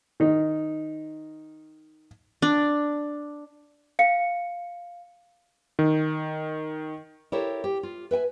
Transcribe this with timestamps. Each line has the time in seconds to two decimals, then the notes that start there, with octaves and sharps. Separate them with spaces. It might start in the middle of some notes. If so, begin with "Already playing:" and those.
0.20 D#3 D#4
2.42 D4
3.99 F5 C#7
5.79 D#3
7.32 E4 G4 A4 A#4 C5 C#5
7.64 G4
7.83 F4
8.11 B4 E5 G5 G#5